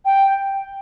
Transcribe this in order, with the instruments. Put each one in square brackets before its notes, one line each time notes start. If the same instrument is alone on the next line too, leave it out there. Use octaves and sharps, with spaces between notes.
[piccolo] G5